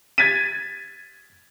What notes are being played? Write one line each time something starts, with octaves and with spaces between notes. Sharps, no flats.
G#6 A6 B6 D#7